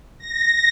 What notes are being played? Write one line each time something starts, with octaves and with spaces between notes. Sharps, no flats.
A#6